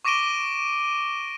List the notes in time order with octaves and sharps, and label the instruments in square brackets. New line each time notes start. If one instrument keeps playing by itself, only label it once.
[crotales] C#6 D6 A#6 D7 D#7 G7